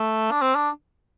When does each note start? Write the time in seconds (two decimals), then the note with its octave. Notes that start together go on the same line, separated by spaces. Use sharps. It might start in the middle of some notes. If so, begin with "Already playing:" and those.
Already playing: A3
0.31 D4
0.42 C4
0.55 D4